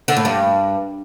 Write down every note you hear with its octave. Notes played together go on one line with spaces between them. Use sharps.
D3
A2
G2